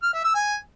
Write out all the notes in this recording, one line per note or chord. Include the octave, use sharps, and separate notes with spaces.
F6
E5
E6
G#5